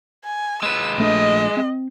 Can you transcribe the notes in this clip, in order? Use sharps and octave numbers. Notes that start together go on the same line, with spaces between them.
G#5
G#3 B4 E6
A#1 A3 D4 D#5
C4